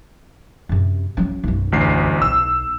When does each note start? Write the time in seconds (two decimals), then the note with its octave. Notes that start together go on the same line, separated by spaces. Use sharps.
0.69 F#2 C3
1.17 F#3 C#4
1.44 B1 F#2
1.72 A1 D2 C7
2.22 B1 E6